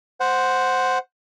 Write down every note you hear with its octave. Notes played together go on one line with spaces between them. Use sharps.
C5 F#5